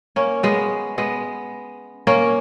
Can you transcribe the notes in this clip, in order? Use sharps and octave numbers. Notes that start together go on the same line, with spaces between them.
A#3 C#4
G#3 B3
G#3 B3
A#3 C#4